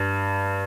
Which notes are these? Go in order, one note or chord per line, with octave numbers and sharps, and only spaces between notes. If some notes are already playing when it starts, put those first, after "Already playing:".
Already playing: G2